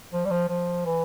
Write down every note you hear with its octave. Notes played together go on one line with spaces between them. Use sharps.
F3
G3
F3
F3
E3